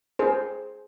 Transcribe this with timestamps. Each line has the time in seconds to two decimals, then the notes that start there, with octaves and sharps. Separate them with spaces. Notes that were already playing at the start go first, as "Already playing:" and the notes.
0.19 G#4 C5